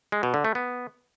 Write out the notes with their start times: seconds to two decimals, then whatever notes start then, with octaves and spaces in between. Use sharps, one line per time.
0.12 G#3
0.23 B2
0.34 D3
0.45 A3
0.55 B3